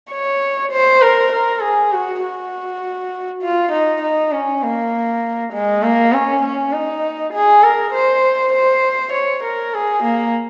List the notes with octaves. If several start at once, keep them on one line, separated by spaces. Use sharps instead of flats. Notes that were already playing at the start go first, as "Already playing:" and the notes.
C#5
C5
A#4
A#4
G#4
F#4
F#4
F4
D#4
D#4
C#4
A#3
G#3
A#3
C#4
C#4
D#4
G#4
A#4
C5
C5
C#5
A#4
G#4
A#3